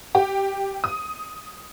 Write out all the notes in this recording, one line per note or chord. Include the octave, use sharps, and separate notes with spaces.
G4
D#6